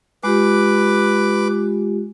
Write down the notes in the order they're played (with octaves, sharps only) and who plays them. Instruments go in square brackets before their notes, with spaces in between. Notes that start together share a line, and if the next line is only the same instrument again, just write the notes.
[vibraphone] G#3 F4 G4 [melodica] B4 D6